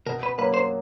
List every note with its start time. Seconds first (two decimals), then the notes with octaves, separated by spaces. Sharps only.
0.07 B2 A#4
0.23 B4
0.38 F#3 A#3 B4
0.54 C5